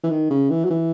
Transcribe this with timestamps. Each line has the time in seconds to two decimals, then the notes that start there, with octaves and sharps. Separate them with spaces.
0.03 E3
0.10 D#3
0.30 C#3
0.50 E3
0.65 F#3
0.70 E3